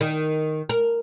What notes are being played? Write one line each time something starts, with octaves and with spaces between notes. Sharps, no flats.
D#3
A#4